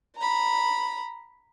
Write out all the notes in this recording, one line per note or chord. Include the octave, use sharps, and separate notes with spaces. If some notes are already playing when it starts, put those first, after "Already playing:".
A#5 B5